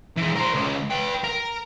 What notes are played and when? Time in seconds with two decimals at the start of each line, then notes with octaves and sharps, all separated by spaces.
0.17 E3 G#3
0.36 A#4 C5
0.55 C#2
0.91 B4 G5
1.24 A#4